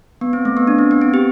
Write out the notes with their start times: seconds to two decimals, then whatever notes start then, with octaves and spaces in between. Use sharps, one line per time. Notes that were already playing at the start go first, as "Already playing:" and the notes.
0.21 B3
0.33 C4
0.45 A3
0.57 B3
0.67 D4
0.79 C4
0.91 B3
1.02 C4
1.14 G4